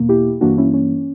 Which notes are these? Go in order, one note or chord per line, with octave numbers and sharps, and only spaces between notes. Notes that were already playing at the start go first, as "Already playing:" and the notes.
Already playing: E2 B2 A#3
E4 G4
G2 E3 A#3 D4 F#4
C#4 E4
C#4